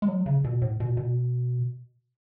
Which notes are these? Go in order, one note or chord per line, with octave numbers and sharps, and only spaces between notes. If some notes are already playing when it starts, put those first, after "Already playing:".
G#3
F#3
C#3
B2
A2
B2
B2